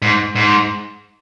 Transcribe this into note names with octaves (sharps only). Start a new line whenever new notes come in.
G#2
G#2